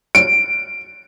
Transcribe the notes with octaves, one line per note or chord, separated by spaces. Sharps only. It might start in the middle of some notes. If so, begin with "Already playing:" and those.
D7